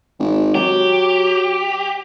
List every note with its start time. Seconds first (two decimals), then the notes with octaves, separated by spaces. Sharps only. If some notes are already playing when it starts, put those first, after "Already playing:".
0.19 G#1
0.55 F#3 G4